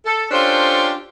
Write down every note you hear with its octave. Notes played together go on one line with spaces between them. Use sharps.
A4
C#4 D4 F4 G4 A4 C5